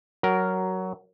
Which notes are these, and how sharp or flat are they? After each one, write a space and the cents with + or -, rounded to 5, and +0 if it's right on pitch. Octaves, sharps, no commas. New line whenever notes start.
F#3 +10 F#4 +20 A#4 +0